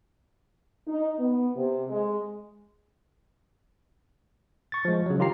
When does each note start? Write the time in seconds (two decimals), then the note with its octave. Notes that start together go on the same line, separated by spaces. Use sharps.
0.87 D#4
1.20 B3
1.56 C3
1.90 G#3
4.72 C#6 A6
4.85 F3 G#3
5.06 C#3 F#3
5.19 D#3 F4 G4 A#5 C7